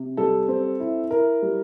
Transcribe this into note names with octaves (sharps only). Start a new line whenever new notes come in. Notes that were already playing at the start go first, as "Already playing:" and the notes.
Already playing: C3
G3 A4
C4
E4
E4 A#4
G3